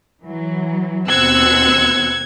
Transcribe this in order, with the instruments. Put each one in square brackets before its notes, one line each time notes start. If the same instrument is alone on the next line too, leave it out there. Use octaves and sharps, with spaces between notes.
[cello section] E3 F#3
[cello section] D#2 B2 C4 [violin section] E6 F#6 C#7 [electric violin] G#6